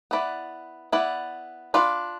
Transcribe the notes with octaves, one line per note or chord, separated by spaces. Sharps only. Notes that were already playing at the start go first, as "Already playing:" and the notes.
B3 E4 B4 D5
B3 E4 B4 D5
D4 F4 B4 D5